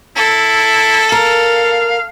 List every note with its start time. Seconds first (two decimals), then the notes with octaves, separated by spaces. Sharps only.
0.16 E4 A4
1.12 A#4 F5